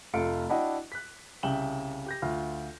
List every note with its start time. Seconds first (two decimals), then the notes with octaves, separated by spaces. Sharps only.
0.13 F1 A3 F4 C#7 D7
0.50 D4 E4 F#4 D#5 F#5 G5
0.92 F#6 B6
1.43 C2 C#3 G5 E7 F#7 G7
2.06 G4 G6 A#6
2.22 D2 F4 F6